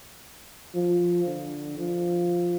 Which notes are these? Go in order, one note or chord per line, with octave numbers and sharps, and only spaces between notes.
F3
D3
F3